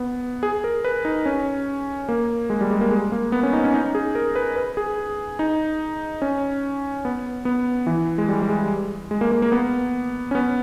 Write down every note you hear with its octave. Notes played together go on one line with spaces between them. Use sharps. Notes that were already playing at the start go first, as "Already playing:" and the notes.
Already playing: B3
G#4
A#4
B4
D#4
C#4
A#3
G#3
G3
G#3
A#3
G#3
A#3
B3
C#4
D#4
C#4
D#4
G#4
A#4
B4
B4
G#4
D#4
C#4
B3
B3
E3
G#3
G3
G3
G#3
G#3
A#3
A#3
A#3
B3
C#4
B3